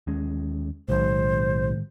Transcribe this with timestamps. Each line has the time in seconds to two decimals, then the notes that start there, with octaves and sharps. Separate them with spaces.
0.07 D#2 G#3 C#4
0.89 B1 A2 D#3 G#3 C5